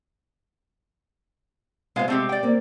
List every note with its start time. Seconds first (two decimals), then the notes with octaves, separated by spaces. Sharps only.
1.96 C3 G#3 B3 F4 C5 F5
2.08 C3 G#3 A3 C4 G4
2.29 D5 G5
2.43 A#3 C4